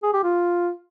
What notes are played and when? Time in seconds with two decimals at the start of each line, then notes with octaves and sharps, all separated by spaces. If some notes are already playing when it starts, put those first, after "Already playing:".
0.03 G#4
0.13 G4
0.23 F4